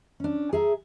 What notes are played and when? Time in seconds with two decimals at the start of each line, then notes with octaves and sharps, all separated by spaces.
0.20 C#4 D4
0.53 G#4 E5 A#5